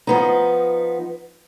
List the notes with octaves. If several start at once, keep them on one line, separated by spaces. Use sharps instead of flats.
F3 B3 D#4